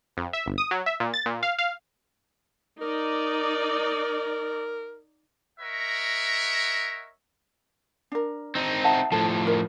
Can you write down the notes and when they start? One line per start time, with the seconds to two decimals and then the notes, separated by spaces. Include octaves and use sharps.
0.17 F2
0.33 E5
0.46 G1
0.58 D#6
0.71 F#3
0.86 E5
1.00 A#2
1.14 A6
1.26 A#2
1.43 F5
1.59 F5
2.81 D#4 A#4 D5
5.59 A#4 C#5 D#5 E5 F#5
8.12 D4 A#4
8.55 C4 D#4
8.84 E5 F#5 A5
9.12 A2 F3 A4
9.47 A#4